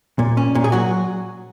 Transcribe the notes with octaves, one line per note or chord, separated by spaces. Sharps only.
A#2
C#4
A#2
G#4
F#3 F#4